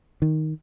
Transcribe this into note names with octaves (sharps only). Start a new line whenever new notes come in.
D#3